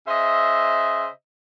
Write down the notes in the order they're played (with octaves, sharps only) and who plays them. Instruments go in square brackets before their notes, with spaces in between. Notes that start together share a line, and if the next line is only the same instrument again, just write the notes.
[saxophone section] C#3 C5 D#5 E5